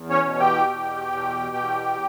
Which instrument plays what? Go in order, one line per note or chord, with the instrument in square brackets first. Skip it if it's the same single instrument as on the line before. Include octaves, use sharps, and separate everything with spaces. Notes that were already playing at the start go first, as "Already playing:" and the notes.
Already playing: [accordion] E2
C#4 C#5
B2
G4 G5
E2
B2
E2